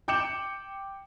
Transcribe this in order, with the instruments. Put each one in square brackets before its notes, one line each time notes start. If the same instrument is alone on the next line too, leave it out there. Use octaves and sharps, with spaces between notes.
[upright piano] G5 D6 G6 C#7 E7 F#7